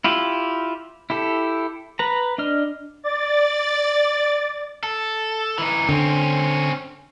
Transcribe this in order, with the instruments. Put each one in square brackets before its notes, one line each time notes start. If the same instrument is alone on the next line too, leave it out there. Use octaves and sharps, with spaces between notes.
[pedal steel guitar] E4 F4 G4
E4 G4 A4
B4 A#5
D4 D#5 F6
[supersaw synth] D5 A6
[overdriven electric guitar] A4
E3 D#4
[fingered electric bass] D3 [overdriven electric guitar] C4 C#4